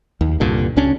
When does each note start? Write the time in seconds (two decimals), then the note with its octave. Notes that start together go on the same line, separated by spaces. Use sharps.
0.21 D#2
0.40 C2 G2 A#2 D3
0.77 C#2 C#3 C#4 D4